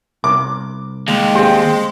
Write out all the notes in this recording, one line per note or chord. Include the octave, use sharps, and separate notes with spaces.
C2 D6
D#2 G#3
C4 G4 G#4